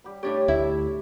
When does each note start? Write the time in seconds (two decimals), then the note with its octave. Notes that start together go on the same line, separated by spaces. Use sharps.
0.04 G3 G4 B5
0.23 A2 D4 G4 C#5
0.48 D2 E4 E5